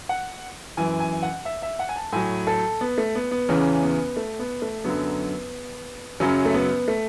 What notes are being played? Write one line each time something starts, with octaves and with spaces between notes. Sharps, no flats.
F#5
F#2 E3 G#5
G#5
F#5
E5
E5
F#5
G#5
A5
A2 F#3 G#5
A4
B3
A3
B3
B3
E2 C#3 E3 C#4
B3
A3
B3
A3
F#2 D3 F#3 B3
F#2 C#3 F#3 C#4
A3
B3
A3